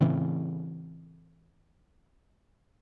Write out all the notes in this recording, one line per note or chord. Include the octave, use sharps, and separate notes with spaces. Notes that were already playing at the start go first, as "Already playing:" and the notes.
A2 C#3 E3 C4